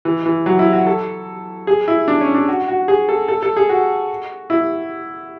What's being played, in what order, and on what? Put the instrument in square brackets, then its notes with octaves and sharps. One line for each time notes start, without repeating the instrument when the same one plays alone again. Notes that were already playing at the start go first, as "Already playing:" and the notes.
[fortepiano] E3
E3
F#3
E4
F#4
A4
G#4
E4
D4
C#4
D4
F#4
F#4
G#4
A4
A4
A4
G#4
F#4
E4